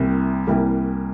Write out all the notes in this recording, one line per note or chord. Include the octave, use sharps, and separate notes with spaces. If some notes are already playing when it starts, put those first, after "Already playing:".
Already playing: C2 C3 E3 G3 A#3
C2 C3 E3 G3 A#3